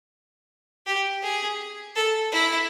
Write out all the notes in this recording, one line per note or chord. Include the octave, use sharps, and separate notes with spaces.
G4
G#4
A4
E4